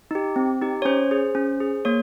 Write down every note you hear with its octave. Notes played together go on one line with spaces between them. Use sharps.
D#4 G4
C4
D#4 G4
C#5
C#4 C5
G#4
C#4
G#4
A#3 C#5